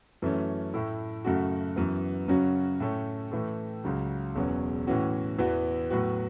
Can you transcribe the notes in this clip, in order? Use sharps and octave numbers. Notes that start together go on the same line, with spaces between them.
F#2 E3 A3 C#4
A2 A3 E4
F#2 C#3 A3 F#4
F#2 E3 B3
F#2 C#3 F#3 C#4 F#4
A2 A3 C#4
A2 E3 A3
C#2 C#3 F#3
E1 E2 B2 F#3 C#4
A2 E3 C#4 F#4
E2 E3 B3 F#4
A2 F#3 B3 F#4